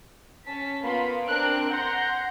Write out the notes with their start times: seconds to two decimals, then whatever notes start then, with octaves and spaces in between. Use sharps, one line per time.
0.45 C#4 A5 B6
0.81 A#3 B3 F4 B5
1.27 C4 D4 A#4 F#6 D7
1.70 F#5 A#5 C6 G6 A#6